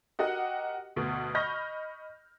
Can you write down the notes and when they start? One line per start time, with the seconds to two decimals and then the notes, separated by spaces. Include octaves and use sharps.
0.19 F#4 G4 A#4 D#5 F#5
0.96 D2 B2
1.35 D#5 B5 C#6 F6 G6 A#6